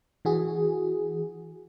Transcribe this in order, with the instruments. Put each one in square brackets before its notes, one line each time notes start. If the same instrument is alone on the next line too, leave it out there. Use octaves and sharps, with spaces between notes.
[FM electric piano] E3 F#4 G#4